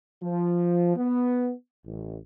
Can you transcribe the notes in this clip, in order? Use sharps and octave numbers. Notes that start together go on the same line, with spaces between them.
F3
B3
A1